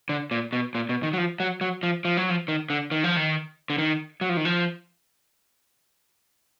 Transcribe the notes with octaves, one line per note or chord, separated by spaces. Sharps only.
D3
A#2
B2
A#2
B2
D#3
F#3
F3
F#3
F#3
F3
F3
F#3
F3
D#3
D3
D#3
F3
D#3
D3
D#3
F#3
F3
D#3
F3